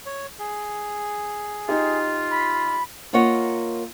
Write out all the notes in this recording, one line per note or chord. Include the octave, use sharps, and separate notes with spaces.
C#5
G#4
D#4 F4 G4
B5
A#3 F4 A#4 C#5 D#5 F#5